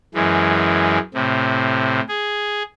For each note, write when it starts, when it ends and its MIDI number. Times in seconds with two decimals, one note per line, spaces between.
0.14 0.99 42
0.14 0.99 52
0.14 0.99 56
1.14 2.01 45
1.14 2.01 48
2.09 2.63 68